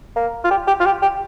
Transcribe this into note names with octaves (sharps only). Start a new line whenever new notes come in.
A#3
F4
G4
G4
F4
G4
G4